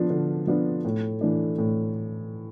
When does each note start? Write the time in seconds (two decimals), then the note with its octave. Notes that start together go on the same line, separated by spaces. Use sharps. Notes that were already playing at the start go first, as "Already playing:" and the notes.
Already playing: F3 B3 D4 F4
0.10 D3
0.47 F3 B3 D4 F4
0.85 A2
1.21 E3 A3 D4
1.58 A2